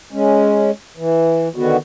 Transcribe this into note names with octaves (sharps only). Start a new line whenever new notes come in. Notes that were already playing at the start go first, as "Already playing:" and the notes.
G#3 C#4
E3
D3 D#3 B3 F#4